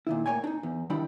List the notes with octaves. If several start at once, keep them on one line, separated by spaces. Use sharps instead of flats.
A#2 D#3 E4
A2 A#3 C#5 G5 G#5
D4 D#4
E2
D#3 G3 D4 E4 G5 B5